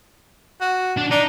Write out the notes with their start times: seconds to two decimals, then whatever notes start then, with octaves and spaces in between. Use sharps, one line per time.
0.61 F#4
0.98 D4
1.11 D4 D#4